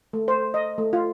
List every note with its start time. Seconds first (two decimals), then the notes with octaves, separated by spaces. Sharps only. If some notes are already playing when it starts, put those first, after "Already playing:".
0.13 A3
0.28 C5
0.54 D#5
0.78 A3
0.93 F4